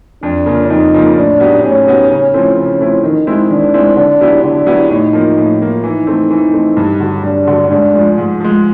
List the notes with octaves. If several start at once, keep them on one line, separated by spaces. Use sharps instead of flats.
F2 D4
C#3 F3 A#3
F2 D#4
C#3 F3 A#3
A2 D4
F#3 B3 D#4 G4
A2 C#4
F#3 B3 D#4 G4
C#3 C#4
F3 A3 C4 E4
C#3 C#4
F3 A3 C4 E4
D#3 D#4
G#3 C4 E4
D#3 D4
G#3 C4 E4
D3 D4
F#3 B3 E4 G4
D3 D4
F#3 B3 E4 G4
A2 D#4
F3 A#3
A2
F3 A#3
E3 D#4
A3 C4
E3
A3 C4
G2
D3 F#3
G2 D4
D3 F#3
G#2 D4
F3 G#3
G#2
F3 G#3